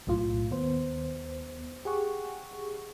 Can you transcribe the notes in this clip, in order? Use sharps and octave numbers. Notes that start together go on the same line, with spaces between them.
B1 F#2 A2 F4
D#2 B3 C5
G4 G#4 F#5 C#6